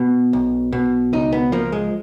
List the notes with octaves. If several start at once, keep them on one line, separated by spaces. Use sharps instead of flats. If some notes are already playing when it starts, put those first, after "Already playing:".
Already playing: B2
B1
B2
C#2 D#4
B3
F3 A#3
G#3